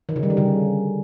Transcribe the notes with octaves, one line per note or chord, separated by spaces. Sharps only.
D#3
C#3
G3
D3
C#3